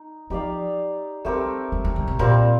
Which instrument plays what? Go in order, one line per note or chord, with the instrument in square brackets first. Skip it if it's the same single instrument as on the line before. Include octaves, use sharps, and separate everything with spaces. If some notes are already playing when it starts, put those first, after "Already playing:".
Already playing: [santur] D#4
[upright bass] F3 [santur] D#4 G4 D5 F5
[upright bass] G3 [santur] A3 C4 G4 A#4
[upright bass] G3
G3
D3
C3
[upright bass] A#2 [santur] G3 C4 F4 A#4